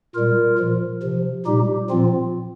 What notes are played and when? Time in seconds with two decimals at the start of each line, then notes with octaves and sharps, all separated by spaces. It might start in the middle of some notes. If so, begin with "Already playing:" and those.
0.15 A#2 G3 F4 A#4
0.59 A#2 F3
1.03 C3 F3
1.46 A#2 G3 D#4 G4
1.90 A#2 F3 C4 F4